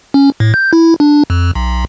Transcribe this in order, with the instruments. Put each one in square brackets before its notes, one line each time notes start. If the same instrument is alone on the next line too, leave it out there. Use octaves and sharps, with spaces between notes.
[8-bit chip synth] C#4
A2
G6
E4
D4
F2
B1